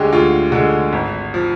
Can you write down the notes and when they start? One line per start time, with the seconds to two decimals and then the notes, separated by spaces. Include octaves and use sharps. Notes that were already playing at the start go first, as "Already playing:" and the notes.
Already playing: D2 D3 G#3 G4 G#4
0.12 D2 F4
0.52 D3 G#3
0.93 G#1
1.34 F3